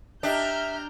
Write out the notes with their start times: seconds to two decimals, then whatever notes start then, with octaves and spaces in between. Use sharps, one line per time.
0.23 D4 G4 D#5 E5 A#5 F6 G6